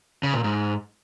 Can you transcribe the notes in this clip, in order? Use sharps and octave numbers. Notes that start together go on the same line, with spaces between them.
C#3
A#2
G#2